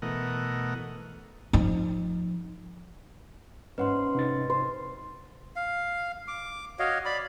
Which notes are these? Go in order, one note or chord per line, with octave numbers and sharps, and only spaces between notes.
B2 E3 A3 A#4 D#5 F#5
F3 D#4
E2 G#2 C#4 B4 F#5 C6
C3 D#4 A6
C5
F5
D6
F#4 C#5 D#5 F5
D5 B5